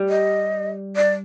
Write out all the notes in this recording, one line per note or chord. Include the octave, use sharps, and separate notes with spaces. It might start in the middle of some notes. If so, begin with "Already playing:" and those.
Already playing: G3
D#5
D5